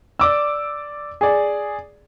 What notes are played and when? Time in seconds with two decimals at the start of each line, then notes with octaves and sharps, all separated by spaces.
0.20 D5 D6 E6
1.21 G#4 D5